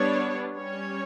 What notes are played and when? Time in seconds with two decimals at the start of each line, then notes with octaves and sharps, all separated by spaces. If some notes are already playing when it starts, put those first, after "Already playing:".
Already playing: G3 B3 D4 C#5
0.56 G3 C#4 C#5